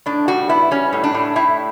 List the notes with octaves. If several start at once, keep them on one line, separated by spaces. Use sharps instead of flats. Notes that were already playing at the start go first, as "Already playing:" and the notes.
A2 D4
G3 F#4
B3 E4
G3 C#4
A2
D4
A2
A2 E4